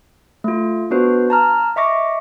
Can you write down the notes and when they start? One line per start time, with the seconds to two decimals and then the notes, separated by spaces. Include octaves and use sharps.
0.44 A3 F4
0.91 B3 D4 F#4 B4 C5
1.30 A5 A#5 F6
1.76 D#5 E5 C#6 D6 A#6